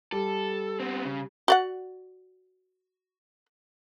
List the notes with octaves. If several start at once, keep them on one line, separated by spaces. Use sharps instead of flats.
G3 A4
B3 C4
C#3
F#4 D5 F#5